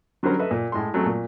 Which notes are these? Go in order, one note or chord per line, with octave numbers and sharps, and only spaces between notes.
D3 F#3 G3 C#4 A#4 C5
A4 B4 D#5 E5
A#2
A2 G#3 C6
F#3 G#3 A3 C4
A#2